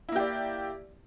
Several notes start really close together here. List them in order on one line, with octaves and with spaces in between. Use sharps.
E4 A#3 G4 D5